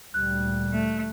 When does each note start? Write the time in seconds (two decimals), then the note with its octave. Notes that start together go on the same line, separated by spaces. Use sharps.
0.14 D2 A#2 G3 F#6
0.72 A3